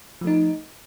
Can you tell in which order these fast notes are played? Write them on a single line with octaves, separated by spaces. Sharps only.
F3 A3 D#4